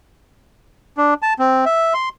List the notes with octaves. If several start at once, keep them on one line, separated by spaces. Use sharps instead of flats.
D4
A5
C4
E5
C6